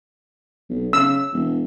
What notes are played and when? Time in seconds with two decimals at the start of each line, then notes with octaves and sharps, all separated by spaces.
0.69 B1
0.93 C#3 E6
1.33 E1